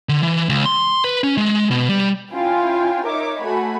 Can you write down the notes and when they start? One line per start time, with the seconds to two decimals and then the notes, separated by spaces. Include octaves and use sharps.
0.09 D3
0.23 E3
0.49 C#2
0.65 C6
1.04 B4
1.24 C#4
1.37 G#3
1.71 B2
1.89 G3
2.32 C#4 E4 F4 G5 G#5
3.05 D#4 A#4 C#5 E5 D6
3.40 A3 F#4 G#5 B5